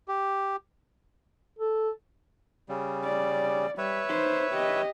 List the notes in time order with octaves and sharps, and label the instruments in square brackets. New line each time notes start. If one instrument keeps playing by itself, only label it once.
[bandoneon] G4
[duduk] A4
[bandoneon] C#3 G3
[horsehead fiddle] D5
[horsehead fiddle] G3 [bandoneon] B4 C#5 E5
[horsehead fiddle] D#4 C5
G4 D#5